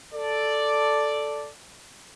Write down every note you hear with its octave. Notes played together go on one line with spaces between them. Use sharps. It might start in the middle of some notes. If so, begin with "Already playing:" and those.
A4 D5